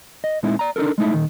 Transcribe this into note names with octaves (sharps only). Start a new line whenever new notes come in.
D#5
A#2 G#3 C4 D#4 E4
D5 A#5
D4 D#4 F4 A4 A#4
G#3 A3 D#4 E4
A#2 D#3